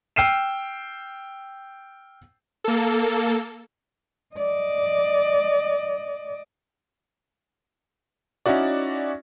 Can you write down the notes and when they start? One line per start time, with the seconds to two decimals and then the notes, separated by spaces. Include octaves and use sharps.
0.16 G5 E6 F6 C7 D#7 E7
2.64 A#3 A4
4.35 D5 D#5
8.46 C#4 D#4 E4 F#4 D5